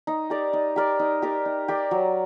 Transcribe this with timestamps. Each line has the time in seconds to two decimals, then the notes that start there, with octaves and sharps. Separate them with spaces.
0.07 D#4
0.30 G4 A#4 D5
0.53 D#4
0.76 G4 A#4 D5
0.99 D#4
1.22 G4 A#4 D5
1.46 D#4
1.68 G4 A#4 D5
1.91 F#3